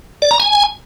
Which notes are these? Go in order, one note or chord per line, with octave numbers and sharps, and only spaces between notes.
D5
A#5
G#5